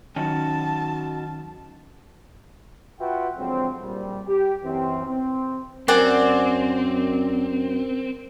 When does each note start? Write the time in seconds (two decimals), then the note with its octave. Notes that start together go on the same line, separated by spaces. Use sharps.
0.16 D#3 F#3 C#4 D#4 F#4 A5
3.00 F4 F#4 B4 E5 F#5 G5
3.37 D3 F3 F#3 G#3 C4
3.81 A#1 G3
4.27 G4
4.64 F#2 E3 C4
5.06 C4
5.88 F#2 C4 A#4 D5 F#5 G#5